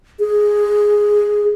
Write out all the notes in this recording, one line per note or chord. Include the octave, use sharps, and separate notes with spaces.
G#4